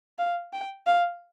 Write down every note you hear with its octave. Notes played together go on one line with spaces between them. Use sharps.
F5
G5
F5